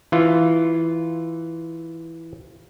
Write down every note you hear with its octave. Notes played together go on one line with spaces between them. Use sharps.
E3 F4